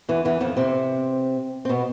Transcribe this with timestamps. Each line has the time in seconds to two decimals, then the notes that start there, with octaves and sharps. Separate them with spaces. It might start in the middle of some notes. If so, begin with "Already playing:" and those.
0.09 E2 E3
0.25 E2 E3
0.41 F2 F3
0.57 C3 C4
1.65 C4
1.69 B2 B3